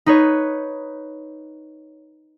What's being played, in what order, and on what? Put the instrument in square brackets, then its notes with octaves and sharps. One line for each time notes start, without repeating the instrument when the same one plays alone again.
[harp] D#4 B4 C#5